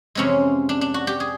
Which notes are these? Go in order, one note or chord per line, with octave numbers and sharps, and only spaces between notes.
F2 C3 E3 G#3 C4 C#4
D4
D4
F#4
G4
G#4